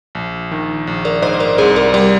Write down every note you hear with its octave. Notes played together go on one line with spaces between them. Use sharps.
A#1
D#3
A#1
A#4 D5
G#2 C5 D#5
A#4 D5
C2 G#4 C5
A#4 D5
G3 A#4 D5